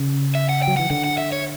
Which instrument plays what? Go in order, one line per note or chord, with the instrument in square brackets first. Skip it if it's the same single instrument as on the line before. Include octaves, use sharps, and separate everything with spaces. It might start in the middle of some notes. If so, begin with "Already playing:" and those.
Already playing: [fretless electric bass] C#3
[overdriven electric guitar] E5
F#5
G5
[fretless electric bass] F#3
[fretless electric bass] E3 [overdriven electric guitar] F#5
[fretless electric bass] D3 [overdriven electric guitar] F#5
[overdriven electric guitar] F#5
E5
C#5